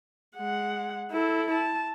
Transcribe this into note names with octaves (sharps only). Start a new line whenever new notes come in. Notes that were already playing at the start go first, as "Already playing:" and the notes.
G#3 F#5
E4 A4
A5